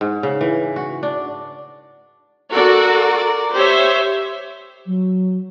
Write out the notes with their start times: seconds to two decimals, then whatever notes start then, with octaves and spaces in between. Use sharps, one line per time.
0.01 G#2
0.23 C#3
0.41 E3
0.76 F#4
1.03 D4
2.51 F#4 A4 A#4 D5
3.53 G4 C5 C#5 E5
4.86 F#3